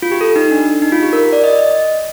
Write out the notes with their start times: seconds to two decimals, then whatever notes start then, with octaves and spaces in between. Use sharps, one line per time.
0.02 F4
0.12 G4
0.21 A4
0.36 D#4
0.51 D4
0.82 D#4
0.92 F4
1.03 G4
1.13 A#4
1.33 D5
1.44 D#5
1.59 D#5